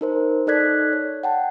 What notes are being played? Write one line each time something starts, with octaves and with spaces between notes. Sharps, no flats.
D#4 A#4 C5
D#4 A4 D5 F#6 G#6 B6
C#5
F#5 G5 A5